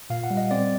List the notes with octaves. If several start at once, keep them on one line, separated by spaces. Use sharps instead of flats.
A#2 F5
F#5
G3
D#5
C4 D5